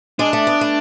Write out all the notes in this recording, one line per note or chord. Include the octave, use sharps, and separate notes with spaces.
G#3 D4
A3
B3
A3